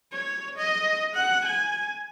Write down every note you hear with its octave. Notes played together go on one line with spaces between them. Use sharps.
C#5
D#5
F#5
G#5